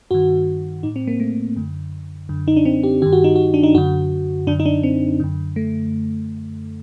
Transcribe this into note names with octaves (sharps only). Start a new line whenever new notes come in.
G2 D#3 F#4
A2 D#4
C4
A#3
A3
F#2 D3
F#2 D3
D#4
D4
C4
G4
G2 D#3 G4
F#4
D#4
F#4
D4
D#4
F#2 D3 F#4
F#2 D3 D4
D#4
D4
C4
F#2 D3
A3